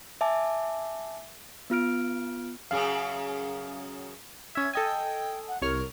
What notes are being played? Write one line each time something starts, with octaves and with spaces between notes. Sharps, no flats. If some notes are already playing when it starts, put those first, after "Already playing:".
E5 G#5 A5 D6
B3 F4 F6 D7
F#2 C#3 G#4 F5
C#4 E5 G#6
A4 D#5 G5 G#5
F#5
C2 A#4 C#5 F6